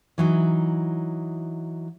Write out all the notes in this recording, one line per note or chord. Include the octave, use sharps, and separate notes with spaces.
E3 F#3 D#4